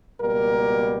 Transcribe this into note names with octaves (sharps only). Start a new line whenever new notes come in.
C#2 B2 G3 A#3 A#4